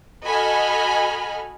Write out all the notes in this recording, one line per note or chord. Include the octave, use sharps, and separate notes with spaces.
F#4 A4 D#5 G#5 B5 F6